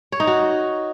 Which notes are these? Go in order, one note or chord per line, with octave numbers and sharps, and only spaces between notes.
C#5
D#4
F#4